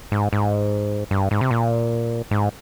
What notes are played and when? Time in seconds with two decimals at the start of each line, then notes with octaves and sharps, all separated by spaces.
0.12 G#2
0.33 G#2
1.11 G2
1.31 G#2
1.41 C3
1.51 A#2
2.31 G#2